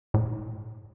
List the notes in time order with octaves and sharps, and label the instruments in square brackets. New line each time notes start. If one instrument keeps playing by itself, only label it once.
[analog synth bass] A2